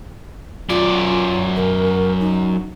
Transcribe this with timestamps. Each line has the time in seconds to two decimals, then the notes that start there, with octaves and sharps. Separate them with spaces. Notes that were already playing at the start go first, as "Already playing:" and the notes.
0.69 F#2 F4 D5
1.56 A#4
2.20 D#4